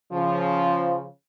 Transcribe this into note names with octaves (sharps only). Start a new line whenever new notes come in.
C#3 F3